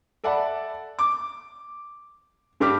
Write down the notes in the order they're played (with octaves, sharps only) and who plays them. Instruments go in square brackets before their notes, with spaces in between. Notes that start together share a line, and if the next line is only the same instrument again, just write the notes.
[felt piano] A4 D5 E5 F#5 A5 B5
D6
G2 G4 D6 F6 B6